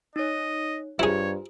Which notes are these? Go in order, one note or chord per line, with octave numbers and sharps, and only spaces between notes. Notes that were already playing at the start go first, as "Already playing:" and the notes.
D#4 C#5 D#5
G2 E4 F4 G4 G#4 C5 C#5